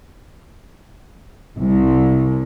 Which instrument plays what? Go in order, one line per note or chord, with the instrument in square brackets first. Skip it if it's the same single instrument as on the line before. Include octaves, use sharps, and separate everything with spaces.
[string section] C2